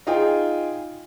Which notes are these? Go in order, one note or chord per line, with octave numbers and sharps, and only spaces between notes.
D#4 F4 G#4 G5